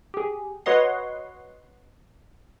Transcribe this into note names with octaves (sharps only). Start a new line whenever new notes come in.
G4 G#4
F#4 B4 C#5 D#5 F#5 C6